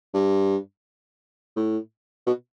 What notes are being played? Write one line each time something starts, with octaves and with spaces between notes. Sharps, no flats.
G2
A2
B2